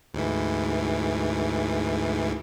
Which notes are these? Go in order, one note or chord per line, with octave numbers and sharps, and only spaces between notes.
D2 G#2 E3